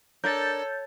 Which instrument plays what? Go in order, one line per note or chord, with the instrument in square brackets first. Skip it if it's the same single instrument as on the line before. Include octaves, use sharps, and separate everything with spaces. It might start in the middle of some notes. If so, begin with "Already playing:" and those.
[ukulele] D4 A#4 [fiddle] A4 [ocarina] C#5 [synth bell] G6 A6